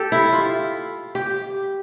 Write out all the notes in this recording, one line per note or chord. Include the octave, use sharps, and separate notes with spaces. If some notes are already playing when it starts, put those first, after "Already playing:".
Already playing: G4 A4
E4
F4
G4